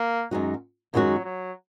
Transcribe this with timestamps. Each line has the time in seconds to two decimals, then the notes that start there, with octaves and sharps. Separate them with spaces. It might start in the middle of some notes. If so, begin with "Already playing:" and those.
Already playing: A#3
0.31 F#2 D#3 G#3 D#4 F#4
0.94 F#2 D#3 F#3 G#3 D#4 F#4
1.24 F#3